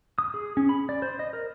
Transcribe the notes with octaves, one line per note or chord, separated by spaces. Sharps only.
D#6
G#4
C#4
B5
D5
C5
D#5
A#4